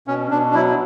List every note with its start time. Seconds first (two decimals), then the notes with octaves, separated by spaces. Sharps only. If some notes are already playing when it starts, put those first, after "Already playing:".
0.07 B2 C#4
0.31 B2 D4
0.51 D4
0.54 F#3 E4